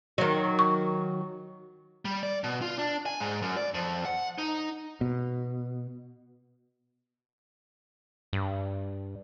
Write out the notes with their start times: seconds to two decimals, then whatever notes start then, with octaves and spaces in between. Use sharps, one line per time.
0.18 D#3 F#3
0.59 C#6
2.05 G3
2.23 D5
2.44 B2
2.62 F4
2.79 D4
3.06 G#5
3.20 G#2
3.42 F#2
3.57 D5
3.74 F2
4.05 F#5
4.38 D#4
5.01 B2
8.33 G2